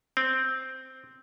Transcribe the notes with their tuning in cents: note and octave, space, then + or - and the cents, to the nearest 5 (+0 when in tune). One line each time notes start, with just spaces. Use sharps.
C4 -5